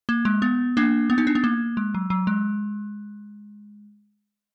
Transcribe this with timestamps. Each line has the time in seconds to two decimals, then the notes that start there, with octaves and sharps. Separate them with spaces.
0.09 A#3
0.25 G#3
0.42 B3
0.77 A#3 D4
1.10 B3
1.18 D#4
1.27 D4
1.35 B3
1.44 A#3
1.77 G#3
1.95 F#3
2.10 F#3
2.27 G#3